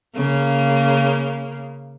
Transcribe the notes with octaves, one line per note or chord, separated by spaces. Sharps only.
C#3 A#3